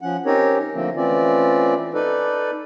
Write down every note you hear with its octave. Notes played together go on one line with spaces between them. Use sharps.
F3 C#4 F#5
C4 C#4 D#4 G4 A#4 C#5
D3 F3 A3 A#3 C4
E3 A3 C4 C#4 F4 D5
D#4 A4 B4 D5